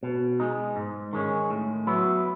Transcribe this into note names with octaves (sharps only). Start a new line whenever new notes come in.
B2
G#3 D#4
G#2
D#3 G#3 C#4
A2
F#3 B3 E4